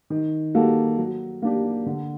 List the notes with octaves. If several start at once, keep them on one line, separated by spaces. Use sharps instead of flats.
D#3
G3 A#3 F#4 A4
F#3
A#3 D4 G4
D3